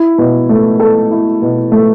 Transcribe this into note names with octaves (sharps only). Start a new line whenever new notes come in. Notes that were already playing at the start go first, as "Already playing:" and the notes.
Already playing: E4
B2
A3
A4
E4
B2
A3